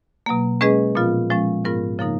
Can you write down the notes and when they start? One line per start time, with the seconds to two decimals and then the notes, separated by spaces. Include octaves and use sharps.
0.26 B2 F#3 A#3
0.61 G#3 C#4 G#4 B4 D#5
0.95 A#2 F3 B3 F4
1.30 F3 G#3 C#4
1.65 G#2 F3 B3 F4 A#4
1.99 C#3 F3 A#3 D#4 A#4